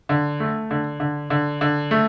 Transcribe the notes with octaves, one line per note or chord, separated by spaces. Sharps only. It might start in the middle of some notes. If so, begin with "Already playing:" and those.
D3
A3
D3
D3
D3
D3
A3